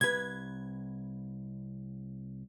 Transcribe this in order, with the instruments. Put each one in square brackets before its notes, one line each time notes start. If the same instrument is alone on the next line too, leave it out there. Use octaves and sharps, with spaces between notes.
[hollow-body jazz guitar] C2 B4 [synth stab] G#6